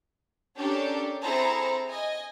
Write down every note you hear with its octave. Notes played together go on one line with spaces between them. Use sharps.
C#4 D4 G4 A4 A#4
C4 E4 G#4 A4 C5 A#5
D#5 G#5